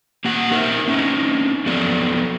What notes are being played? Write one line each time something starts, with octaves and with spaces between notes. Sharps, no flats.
A#3 G4 F#5
D#4 A#4 C5 D#5 E5
C4 C#4 D#4
F2 F#3 B3 A4 D5